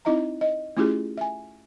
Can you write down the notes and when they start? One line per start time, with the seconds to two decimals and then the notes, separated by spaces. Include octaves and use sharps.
0.05 C4 D#4 E4 D#5 E5 A#5
0.41 D#5
0.77 A3 C#4 E4 F4 G4 G#4
1.18 E5 G#5